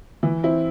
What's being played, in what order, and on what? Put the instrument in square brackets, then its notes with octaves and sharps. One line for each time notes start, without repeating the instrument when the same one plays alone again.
[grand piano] E3
C4 E4